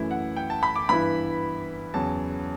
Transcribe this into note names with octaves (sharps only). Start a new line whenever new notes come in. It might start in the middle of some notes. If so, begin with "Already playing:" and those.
Already playing: F#2 E3 A3 E4
F#5
G5
A5
B5
D6
G2 E3 B3 E4 B5
E2 C#3 F#3 A5